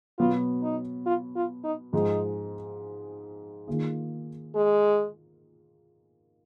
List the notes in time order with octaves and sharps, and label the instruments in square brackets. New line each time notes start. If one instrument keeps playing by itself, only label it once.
[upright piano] B2 F#3 B3 [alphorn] F4
[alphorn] D#4
F4
F4
D#4
[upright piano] G#2 F3 G#3 [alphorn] D#4
[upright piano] D#3 A#3 F4 G#4
[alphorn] G#3